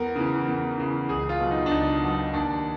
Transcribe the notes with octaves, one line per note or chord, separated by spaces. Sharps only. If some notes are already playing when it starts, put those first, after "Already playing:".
Already playing: E2 A#4
C#3 E3
E2
C#3 E3
C#2 G#4
F4
B2 F#3
D#4
D4
C#2 D#4
B2 F#3
D#2 D4